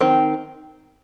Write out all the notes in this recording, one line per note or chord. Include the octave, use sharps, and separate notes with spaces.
D#3 C4